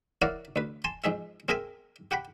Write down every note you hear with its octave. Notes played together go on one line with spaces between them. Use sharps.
E4 A#4 C#5 D5 F5 F#5
D2 B4
G#5 A5 C6
F2 G#2 G#4 E5
C4 G#4 A#4 E5 G5 G#5
G4 F#5 G5 B5